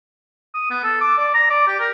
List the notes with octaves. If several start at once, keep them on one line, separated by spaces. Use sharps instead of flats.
D#6
B3
A4
D6
D5
A#5
D5
G4
A#4